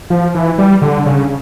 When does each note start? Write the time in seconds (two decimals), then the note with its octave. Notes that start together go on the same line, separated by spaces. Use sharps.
0.10 F3
0.35 E3
0.58 G3
0.82 D3
1.06 C#3